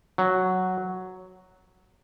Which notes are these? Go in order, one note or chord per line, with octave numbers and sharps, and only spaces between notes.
F#3